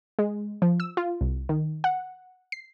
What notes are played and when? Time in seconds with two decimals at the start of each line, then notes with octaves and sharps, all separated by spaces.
0.19 G#3
0.62 F3
0.80 E6
0.97 F4
1.21 C2
1.49 D#3
1.84 F#5
2.52 C7